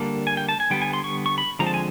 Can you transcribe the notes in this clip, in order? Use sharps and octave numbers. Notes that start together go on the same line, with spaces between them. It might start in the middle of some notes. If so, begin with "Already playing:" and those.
Already playing: D3 G3 A#3 A5
G#5
G5
A5
G#5
D3 G3 B3 G5
G#5
C6
C#6
C#6
B5
D3 F3 G#3 C4 A#5
A5
G#5